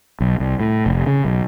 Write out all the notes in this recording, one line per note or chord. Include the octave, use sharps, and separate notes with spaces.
B1
C2
A2
F1
C#3
B1